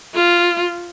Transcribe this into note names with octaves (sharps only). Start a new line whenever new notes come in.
F4